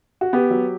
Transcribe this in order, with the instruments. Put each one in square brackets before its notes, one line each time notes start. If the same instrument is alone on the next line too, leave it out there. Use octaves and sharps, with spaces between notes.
[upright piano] F#4
B3 G4
F#3